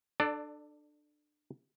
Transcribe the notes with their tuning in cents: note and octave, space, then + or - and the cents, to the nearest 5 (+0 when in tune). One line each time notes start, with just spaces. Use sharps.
D4 +25 A4 +0 D5 +0